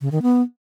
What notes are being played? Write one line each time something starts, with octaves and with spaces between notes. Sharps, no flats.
C#3
D#3
B3